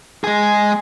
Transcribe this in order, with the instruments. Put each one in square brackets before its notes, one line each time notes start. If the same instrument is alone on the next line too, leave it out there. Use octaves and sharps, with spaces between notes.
[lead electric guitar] G#3 G#4